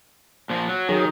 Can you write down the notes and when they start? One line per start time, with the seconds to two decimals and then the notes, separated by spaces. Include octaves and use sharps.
0.50 A#2 F3
0.68 F#3
0.89 D#3 F#3 G#4